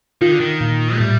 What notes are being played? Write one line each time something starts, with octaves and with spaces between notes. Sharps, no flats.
D#3 F4
D3
D#3
A#2
A3
A2 G3